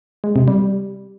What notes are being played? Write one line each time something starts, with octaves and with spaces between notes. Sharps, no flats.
G#3
C3
G3